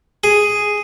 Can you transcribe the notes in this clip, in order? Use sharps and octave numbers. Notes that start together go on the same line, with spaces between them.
G#4